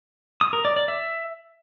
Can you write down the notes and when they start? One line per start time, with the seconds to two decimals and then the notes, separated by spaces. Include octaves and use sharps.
0.41 D#6
0.53 A#4
0.65 D5
0.76 D5
0.88 E5